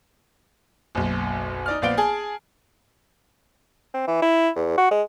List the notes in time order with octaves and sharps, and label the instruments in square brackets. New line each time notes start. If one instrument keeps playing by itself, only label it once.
[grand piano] F#1 B1
D#4 D5 F6
A#1 B3 D5 F5 D7 G7
G#4 G#5 A5
[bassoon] C4
E3
E4
E2
F#4
G#3